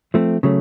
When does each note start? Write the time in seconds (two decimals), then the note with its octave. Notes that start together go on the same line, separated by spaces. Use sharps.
0.14 F3 A3 C4
0.43 C#3 F#3 A3